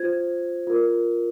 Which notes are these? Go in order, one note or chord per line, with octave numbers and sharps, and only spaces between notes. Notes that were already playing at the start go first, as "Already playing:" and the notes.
Already playing: F4 C5 G#6
F4 A#4